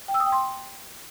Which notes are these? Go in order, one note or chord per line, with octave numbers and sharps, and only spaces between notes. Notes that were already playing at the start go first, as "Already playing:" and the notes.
G5
E6
D#6
G5
C6